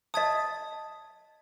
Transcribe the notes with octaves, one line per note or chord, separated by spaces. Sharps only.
D#5 A5 D#6 G#6 B6